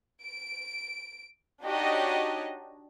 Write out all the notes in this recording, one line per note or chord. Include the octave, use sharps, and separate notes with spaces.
D7
D4 D#4 F#4 G4 C#5 D#5